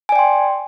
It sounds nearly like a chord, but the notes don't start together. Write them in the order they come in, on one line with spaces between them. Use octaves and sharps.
G#5 D5 G5 C6